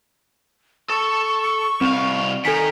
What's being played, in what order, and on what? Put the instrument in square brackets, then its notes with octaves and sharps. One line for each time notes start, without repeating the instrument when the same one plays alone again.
[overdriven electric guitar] A4 [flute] C#6
[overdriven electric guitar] C2 F5 [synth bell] C4
[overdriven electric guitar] D#3 A#4 [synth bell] A4 G#5 B6